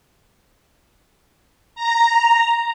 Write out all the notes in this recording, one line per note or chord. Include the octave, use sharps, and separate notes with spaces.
A#5